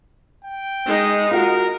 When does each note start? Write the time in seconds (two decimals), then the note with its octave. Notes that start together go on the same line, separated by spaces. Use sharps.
0.45 G5
0.87 G#3 D#4
1.31 F4 F#4 A#4